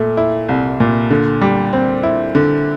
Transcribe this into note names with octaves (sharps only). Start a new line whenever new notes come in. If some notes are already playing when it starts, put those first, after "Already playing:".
Already playing: A#2 A3
E4
C2
A#2
D3
G3
C4
E4
D3